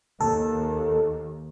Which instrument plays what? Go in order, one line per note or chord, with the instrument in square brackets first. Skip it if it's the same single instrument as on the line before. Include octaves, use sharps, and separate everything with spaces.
[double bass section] D#2 [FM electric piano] A4